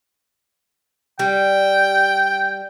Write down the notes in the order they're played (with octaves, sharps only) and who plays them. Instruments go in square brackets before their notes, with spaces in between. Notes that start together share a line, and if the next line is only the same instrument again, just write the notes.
[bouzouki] G3 [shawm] G5